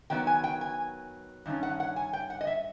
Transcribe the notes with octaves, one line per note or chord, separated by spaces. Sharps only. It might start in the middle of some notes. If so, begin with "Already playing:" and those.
D#3 F#3 B3 G5
G#5
G5
G#5
G2 D#3 C#4
F#5
F#5
G#5
G5
F#5
D#5
E5